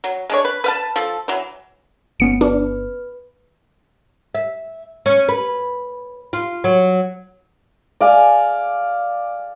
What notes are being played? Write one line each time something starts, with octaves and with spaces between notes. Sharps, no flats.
F#3
G#3 D4 C#5
B4
B4 F5 A5
F3 A4
E3 F#3
G1 B3 C#4 C#7
D4 B4
E5
C#4
B4
F4
F#3
D5 F5 G#5